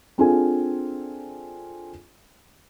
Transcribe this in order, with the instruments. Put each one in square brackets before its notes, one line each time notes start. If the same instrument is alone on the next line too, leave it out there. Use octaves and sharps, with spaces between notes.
[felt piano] C4 D4 F4 G#4 A4 G#5